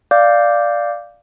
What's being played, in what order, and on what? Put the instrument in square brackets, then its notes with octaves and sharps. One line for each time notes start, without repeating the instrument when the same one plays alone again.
[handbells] D5 F5 D6 G6